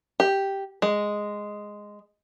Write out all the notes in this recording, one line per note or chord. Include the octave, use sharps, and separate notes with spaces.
G4
G#3